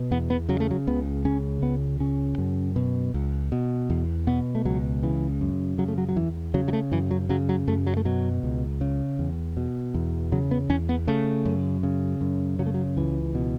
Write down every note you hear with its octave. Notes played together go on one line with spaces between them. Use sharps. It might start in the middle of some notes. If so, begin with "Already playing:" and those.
Already playing: B2
E2 B3
B3
C#3 F#3
A3
F#3
C#2 B3
C#3 C#4
C#2 B3
C#3 C#4
F#2
B2
C#2
B2
E2
B2 B3
A3
C#2 F#3
C#3 E3
F#2
C#3 F#3
A3
F#3
F#3
E2 E3
C#3 F#3
F#3
A3
F#2 E3
F#3
C#3 F#3
F#3
F#2 A3
F#3
A3
B2 F#3
C#2
C#3
E2
B2
E2
C#3 F#3
B3
E2 C#4
B3
C#3 A3
F#2
C#3
F#2
C#3 F#3
A3
F#3
C#2 E3
B2